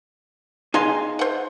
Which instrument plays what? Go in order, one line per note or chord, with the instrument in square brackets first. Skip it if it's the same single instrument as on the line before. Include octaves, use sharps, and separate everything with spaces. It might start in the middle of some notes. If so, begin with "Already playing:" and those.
[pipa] G#3 C6 [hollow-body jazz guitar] D#4 F5 G#5
[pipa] C5 F#5